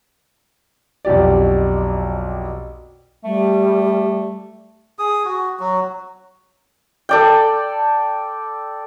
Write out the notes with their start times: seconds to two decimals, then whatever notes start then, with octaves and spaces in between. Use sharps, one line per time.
1.05 B1 F2 G4 D5
3.24 G3 A3
4.99 G#4 D#6
5.25 F#4
5.60 F#3 F#4
7.09 A4 D5 G5